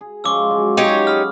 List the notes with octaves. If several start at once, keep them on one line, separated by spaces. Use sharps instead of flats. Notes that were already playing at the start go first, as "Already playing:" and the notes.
G#4
F3 G#3 C#4 C#6 D6 E6
F#3 G#3 F4
D#4 G4 C#5
B5 D#6 F6